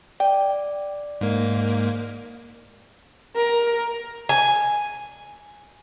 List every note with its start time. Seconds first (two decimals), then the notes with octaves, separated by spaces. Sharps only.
0.20 D5 G5
1.21 G#2 A#3
3.36 A#4
4.29 G#5